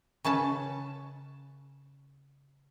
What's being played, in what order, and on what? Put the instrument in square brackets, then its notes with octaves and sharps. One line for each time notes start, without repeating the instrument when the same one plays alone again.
[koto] C#3 C#4 B4 A5